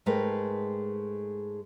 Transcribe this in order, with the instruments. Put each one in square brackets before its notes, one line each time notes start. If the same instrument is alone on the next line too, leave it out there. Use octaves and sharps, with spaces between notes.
[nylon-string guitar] G#2 G#3 A3 A#4 B4 G5